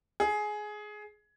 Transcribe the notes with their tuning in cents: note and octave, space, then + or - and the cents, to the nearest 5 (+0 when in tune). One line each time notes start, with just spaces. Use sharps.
G#4 +15